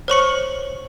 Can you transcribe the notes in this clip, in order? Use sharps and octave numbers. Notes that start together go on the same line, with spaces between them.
C5 C#5 C#6 C#7